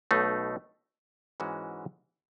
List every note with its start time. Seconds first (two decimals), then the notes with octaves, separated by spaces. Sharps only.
0.11 B1 B2 A3 D#4
1.40 G#2 E3 G#3 C#4 F#4